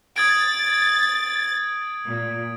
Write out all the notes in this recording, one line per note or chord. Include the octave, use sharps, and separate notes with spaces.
D#6 G#6 A6 D7
A#2